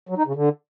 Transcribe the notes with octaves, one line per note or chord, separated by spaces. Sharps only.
F#3
D#4
C#3
D3